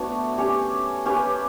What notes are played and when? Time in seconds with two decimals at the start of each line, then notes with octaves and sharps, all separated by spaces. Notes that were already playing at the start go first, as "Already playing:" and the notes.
Already playing: A3 B3 D4 F#4 C#5
0.38 C#4 G4 C#5
1.06 C#4 G4 B4